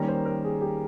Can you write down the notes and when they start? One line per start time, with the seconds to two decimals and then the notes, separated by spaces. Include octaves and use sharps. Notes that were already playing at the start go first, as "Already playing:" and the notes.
Already playing: D#3 G3 A#3 C#4 A#5
0.08 C5
0.26 A#4
0.44 G#4
0.62 G4